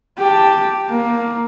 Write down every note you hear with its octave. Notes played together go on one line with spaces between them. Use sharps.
G4 A5
A#3